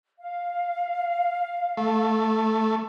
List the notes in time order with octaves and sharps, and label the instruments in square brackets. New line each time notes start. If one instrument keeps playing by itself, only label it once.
[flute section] F5
[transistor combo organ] A3